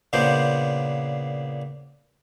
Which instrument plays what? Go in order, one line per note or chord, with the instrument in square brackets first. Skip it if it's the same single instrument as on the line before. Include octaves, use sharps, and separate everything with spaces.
[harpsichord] A#2 C#3 B3 D4 C5